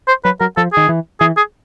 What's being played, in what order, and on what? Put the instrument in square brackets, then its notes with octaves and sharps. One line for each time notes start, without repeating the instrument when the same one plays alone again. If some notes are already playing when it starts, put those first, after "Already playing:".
[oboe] C5
[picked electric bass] F#3 [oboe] B4
[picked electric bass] F#3 [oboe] A#4
[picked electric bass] F3 [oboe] A4
[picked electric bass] D#3 [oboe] G#4
[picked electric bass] E3
[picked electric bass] E3 [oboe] G#4
[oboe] G#4